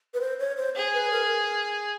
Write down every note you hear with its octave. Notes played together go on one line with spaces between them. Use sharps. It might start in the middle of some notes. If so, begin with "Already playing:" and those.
B4
C5
C#5
C5
G#4 C5
B4
A#4